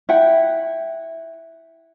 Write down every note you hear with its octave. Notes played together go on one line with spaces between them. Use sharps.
E4 F#5 G5